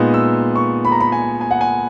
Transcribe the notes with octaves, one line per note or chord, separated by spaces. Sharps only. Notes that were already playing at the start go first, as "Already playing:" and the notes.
Already playing: A#2 G#3 B3 D#4
E6
C#6
B5
A#5
B5
G#5
G#5
F#5
G#5